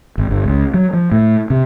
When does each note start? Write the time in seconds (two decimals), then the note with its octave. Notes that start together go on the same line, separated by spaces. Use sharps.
0.18 G#1
0.30 G1
0.45 C#2
0.74 F#3
0.93 F3
1.12 A2
1.50 C3